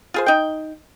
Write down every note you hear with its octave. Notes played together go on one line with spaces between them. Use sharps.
F4 G#4 C5
D#4 G5